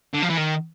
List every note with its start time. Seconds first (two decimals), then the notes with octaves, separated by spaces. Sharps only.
0.13 D3
0.22 F3
0.29 E3
0.37 D#3